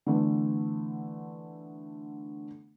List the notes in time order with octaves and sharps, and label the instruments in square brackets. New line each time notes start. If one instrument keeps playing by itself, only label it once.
[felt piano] D3 E3 A3 B3